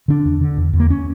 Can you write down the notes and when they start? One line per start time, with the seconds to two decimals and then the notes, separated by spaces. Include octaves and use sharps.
0.08 D3 D4
0.25 E2
0.41 D3
0.57 E2
0.73 E2
0.80 A#3
0.90 C#4